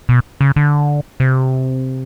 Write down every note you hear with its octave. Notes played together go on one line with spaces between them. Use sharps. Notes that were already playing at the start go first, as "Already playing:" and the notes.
B2
C#3
D3
C3